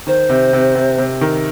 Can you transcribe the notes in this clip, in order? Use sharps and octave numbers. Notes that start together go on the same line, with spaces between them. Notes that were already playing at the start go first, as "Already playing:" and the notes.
D#3 C5
C3
C3
C3
C3
D#3